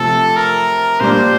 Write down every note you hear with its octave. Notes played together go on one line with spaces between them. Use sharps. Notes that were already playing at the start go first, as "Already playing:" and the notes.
Already playing: C3 F3 A3 A4
A#4
A#2 G3 D4 C5